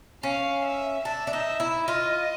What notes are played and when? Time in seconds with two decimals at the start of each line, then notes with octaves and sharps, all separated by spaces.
0.23 C#4 F5
0.65 E5
1.05 D4 E5
1.27 D4
1.33 D#4
1.60 E4
1.87 F4 D#5